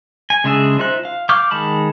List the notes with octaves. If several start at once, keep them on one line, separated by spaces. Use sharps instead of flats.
G#5
C#3 G#3 D4 G#4 E5
D#4 F4 C5 E5 F#6
F5
F5 C#6 D6 F6 G6
D#3 G#3 A5 B5